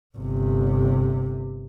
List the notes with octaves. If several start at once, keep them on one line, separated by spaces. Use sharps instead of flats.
G1 C3